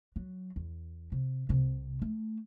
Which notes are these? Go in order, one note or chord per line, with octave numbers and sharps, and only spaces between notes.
F#3
E2
C3
C2 C3
A3